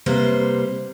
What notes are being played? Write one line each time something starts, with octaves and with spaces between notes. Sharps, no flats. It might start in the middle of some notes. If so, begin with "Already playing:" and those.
C3 G3 A#3 B4 C5